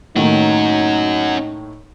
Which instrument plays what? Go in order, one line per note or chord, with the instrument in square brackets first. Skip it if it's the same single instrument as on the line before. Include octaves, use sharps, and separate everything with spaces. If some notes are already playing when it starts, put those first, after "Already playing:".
[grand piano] A2 D#3 A#3 [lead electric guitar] C#4 F#4 [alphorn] D#4